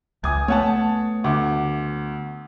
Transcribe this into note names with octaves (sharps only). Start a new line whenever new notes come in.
C#2 G#5 D#6 G#6
A3 B3 C#5 F#5 A5
D2 D6